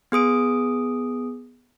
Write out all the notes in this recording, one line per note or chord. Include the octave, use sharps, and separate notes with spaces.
B3 G#4 D#6 D7